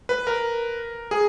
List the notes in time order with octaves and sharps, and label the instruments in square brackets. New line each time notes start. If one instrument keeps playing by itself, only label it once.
[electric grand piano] B4
A#4
G#4